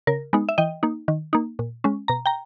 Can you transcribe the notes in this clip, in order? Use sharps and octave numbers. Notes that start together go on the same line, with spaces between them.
C#3 A#4
G#3 B3 D#4
E5
E3 D#5 G5
A#3 D#4
D#3
A#3 D#4
A#2
G#3 C#4
B2 A#5
G5 A#5